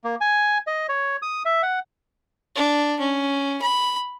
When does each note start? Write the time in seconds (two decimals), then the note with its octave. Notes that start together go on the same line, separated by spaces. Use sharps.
0.04 A#3
0.21 G#5
0.67 D#5
0.89 C#5
1.22 D#6
1.45 E5
1.63 F#5
2.55 D4
2.99 C#4
3.62 B5